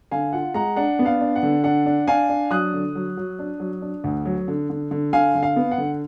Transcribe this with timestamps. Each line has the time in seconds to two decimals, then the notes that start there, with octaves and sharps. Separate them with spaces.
0.11 D3 F5 G#5
0.33 F4 F#5
0.54 G#3 F#5 A#5
0.76 D4 F#5
0.99 B3
1.06 F5
1.21 D4
1.36 F#5
1.43 D3
1.64 D4 F#5
1.86 D4
2.08 D4 F5 G#5
2.29 D4
2.51 F#3 D#6 F#6
2.73 D3
2.95 F#3
3.17 F#3
3.39 D4
3.60 F#3
3.82 D4
4.04 D2
4.26 F#3
4.48 D3
4.70 D3
4.91 D3
5.13 D3 F5 G#5
5.35 D3
5.43 F5
5.56 B3
5.71 F#5
5.78 D3